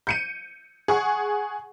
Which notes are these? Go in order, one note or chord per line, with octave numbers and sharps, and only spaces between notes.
G6 C#7 D#7
G#4 F#5 C#6